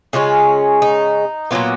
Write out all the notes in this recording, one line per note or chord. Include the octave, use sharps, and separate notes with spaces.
C#3 G#3 C#4 F4
D#4
A#2 F#3 B3 F4